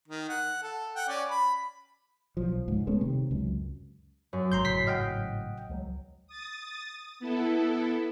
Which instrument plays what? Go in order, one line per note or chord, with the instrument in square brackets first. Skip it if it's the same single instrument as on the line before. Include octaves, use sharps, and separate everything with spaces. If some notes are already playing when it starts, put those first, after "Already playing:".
[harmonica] D#3
F#5
A4
F#5 G5
C#4 D5
B5
[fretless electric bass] B1 F3
C#2 G#2
G#3 A3 B3 C#4
C3 D#3
C#2 F#2
[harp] F#2
[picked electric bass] G#1 [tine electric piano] A#5 C6 G6
[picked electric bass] G#1 A2 C#3 [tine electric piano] B6 C7
[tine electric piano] D#5 F#5 G5 [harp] F6 G6 B6
[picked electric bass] C#2 F3 F#3
[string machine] D#6 A6
B3 E4 A4